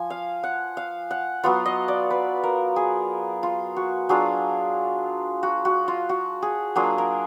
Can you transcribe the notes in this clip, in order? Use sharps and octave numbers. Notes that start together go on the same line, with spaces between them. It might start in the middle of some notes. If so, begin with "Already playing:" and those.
Already playing: F3 G#5
F5
F#5
F5
F#5
F#3 B3 F4 F#5
D#5
D5
B4
A#4
G#4
F4
F#4
F#3 D4 F4 G#4
F#4
F#4
F4
F#4
G#4
F#3 A#3 D4 F4 G#4
A#4